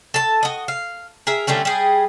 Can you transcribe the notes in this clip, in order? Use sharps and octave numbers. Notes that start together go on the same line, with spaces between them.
A4 A5
F#4 D#5
F5
G#4 A#4 E5
D3 G3 A3 C#4
G3 G#4